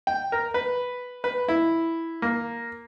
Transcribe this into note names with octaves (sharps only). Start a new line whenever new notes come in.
G5
A#4
B4
B4
E4
A#3